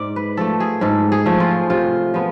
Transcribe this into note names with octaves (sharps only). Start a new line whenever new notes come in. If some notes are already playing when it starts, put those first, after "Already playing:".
Already playing: G#2 D5
B4
F3 A3 A4
G#4
G#2 A4
G#4
F3 A3
F4
C3 F4
F3 B3